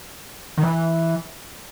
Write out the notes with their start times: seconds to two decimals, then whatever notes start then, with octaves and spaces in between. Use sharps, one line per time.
0.58 D#3
0.63 E3